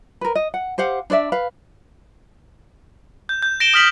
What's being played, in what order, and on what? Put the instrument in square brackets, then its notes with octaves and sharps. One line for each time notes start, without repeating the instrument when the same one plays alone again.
[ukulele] A#4 B4
D#5
F#5
G4 C5 F5 F#5
D4 C5 D5 E5
B4 F5
[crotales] G6
G6
A#6 D7 E7 G7
D#6 F6 B6 F#7